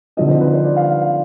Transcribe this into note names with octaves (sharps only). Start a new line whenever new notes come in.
D3 F3 C4 D#4 D#5
C5
B4
C5
D5
F5